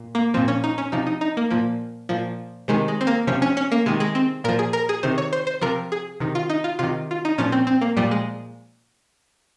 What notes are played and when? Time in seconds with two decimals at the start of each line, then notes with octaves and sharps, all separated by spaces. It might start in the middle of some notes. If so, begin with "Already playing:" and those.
Already playing: A#2
0.15 A#3
0.34 A#2 F3 C4
0.48 C#4
0.64 D#4
0.78 C#4
0.92 C3 F3 D#4
1.06 D#4
1.21 D#4
1.37 A#3
1.50 A#2 F3 A#3
2.09 A#2 F3
2.68 C3 D#3 G#3
2.88 G#3
3.01 C4
3.07 A#3
3.27 C3 F3 C#4
3.42 C#4
3.57 C#4
3.72 A#3
3.86 C3 D#3 G#3
4.00 G#3
4.15 C4
4.44 A#2 F3 A#4
4.59 G#4
4.73 A#4
4.89 G#4
5.03 C3 D#3 C5
5.18 C#5
5.33 C5
5.47 C5
5.61 C3 F3 A#4
5.92 G#4
6.20 C3 D#3
6.35 F4
6.50 D#4
6.64 F4
6.79 C3 D#3 F4
7.11 F4
7.25 D#4
7.38 A#2 F3 C#4
7.52 C4
7.67 C4
7.81 A#3
7.97 A#2 F3 G3
8.11 G#3